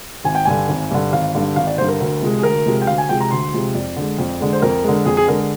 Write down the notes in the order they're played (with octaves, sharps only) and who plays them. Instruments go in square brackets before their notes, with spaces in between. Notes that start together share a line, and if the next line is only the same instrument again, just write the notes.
[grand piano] G#1 G#5
G5
G2 D3 G#5
G#1
G2 D3
G#1 F5
G2 D3
G#1 F5
D5
D3 C5
G2
A#4
D2
C3 F3 G#3
G#4
D2 A#4
C3 F3 G#3
G5
D2 F5
G#5
C3 F3 G#3 G5
A#5
D2 C6
C3 F3 G#3
F2 D5
D3 G#3
F2
D3 G#3
C5
F2 A#4
D3 G#3
F2 G#4
G#4
D3 G#3 A#4